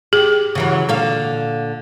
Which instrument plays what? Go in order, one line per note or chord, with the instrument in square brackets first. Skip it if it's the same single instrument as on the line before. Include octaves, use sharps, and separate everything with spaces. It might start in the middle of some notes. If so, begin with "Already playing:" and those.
[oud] G4 [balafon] G#4
[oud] C#3 E3 F#3
A#2 D3 F5